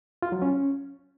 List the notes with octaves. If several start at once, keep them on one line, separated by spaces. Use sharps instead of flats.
F4
F#3
C#4